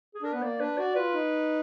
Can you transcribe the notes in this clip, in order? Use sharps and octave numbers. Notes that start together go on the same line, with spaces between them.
G#4
D4 A#4
B3 B4
A#3 D5
D4 B4
F#4 D5
F4 B4
D#4